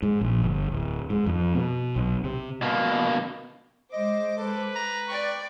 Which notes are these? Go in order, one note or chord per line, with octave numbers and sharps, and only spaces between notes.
G#2
A#1
G1
D1
G#2
F2
B2
B1
C3
B2 A#3
G#3 C5 D#5 D6
A4 B4
A#5
D5 G5 C#6